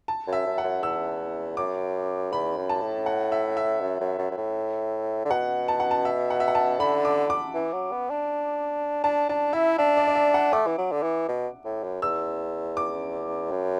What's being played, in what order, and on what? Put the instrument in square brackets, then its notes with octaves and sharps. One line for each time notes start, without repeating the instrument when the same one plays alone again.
[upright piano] A5
[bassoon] F#2
[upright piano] E5
[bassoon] F#2
[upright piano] F#5
[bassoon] F#2
[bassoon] E2 [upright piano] E6
[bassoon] F#2 [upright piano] D6
[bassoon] E2 [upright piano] B5
[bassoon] F#2
[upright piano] A5
[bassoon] A2
[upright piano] F#5
E5
E5
[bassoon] F#2
F#2
F#2
F#2
A2
D3
[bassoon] B2 [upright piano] F#5
[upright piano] A5
F#5
A5
E5
F#5
E5
F#5
A5
[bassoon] D3 [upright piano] B5
[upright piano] D6
D6
[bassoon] E3
F#3
B3
D4
[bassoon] D4 [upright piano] A5
[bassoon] D4 [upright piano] A5
[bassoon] E4 [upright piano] E5
[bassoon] D4 [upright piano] E5
[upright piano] D5
D5
E5
F#5
[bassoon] A3 [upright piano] D6
[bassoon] E3
F#3
D3
E3
B2
A2
F#2
[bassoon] E2 [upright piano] E6
[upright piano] D6
[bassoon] F#2